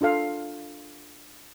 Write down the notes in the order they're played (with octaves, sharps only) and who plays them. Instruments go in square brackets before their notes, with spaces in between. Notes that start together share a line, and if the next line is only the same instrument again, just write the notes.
[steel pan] D4 F4 A4 F5